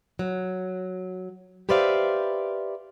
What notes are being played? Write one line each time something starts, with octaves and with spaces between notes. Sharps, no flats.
F#3
G4 B4 C5 D5 E5 F5